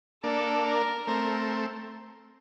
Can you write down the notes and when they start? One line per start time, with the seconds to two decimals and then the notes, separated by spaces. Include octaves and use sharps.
0.23 A#3 D4 A4
0.66 A#4
1.07 A3 C4 A#4